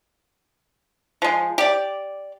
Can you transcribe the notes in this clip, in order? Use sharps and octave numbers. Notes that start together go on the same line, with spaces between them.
F3 G#3
G4 D5